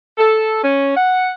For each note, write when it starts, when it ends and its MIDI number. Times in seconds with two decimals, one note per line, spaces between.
0.18 0.61 69
0.62 0.94 61
0.96 1.32 78